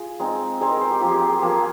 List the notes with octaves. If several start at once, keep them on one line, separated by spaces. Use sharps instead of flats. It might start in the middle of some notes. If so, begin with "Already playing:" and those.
Already playing: F4 G#4
G#3 C4 D#4
G#3 C4 D#4 G#4
A#4
C5
G4
F3 A#3 F4 G4
G#4
G4
G#4
F3 A#3 F4 G4
G#4